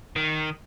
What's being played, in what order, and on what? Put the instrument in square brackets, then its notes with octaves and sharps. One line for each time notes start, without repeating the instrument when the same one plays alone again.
[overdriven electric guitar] D#3